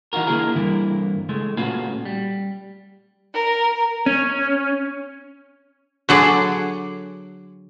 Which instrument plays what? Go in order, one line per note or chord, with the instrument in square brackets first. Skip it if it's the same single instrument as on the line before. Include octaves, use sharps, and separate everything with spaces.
[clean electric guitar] E3 D#4 F4 F#4 A#4
D3 A#3 E4 G#4 A#4
G2 D3 E3 A#3 E4
C#2 G#3 A3
A#2 A3 C#4 F4 F#4 B4
G3
[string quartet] A#4
[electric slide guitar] C#4
[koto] D3 F#3 G#4 D5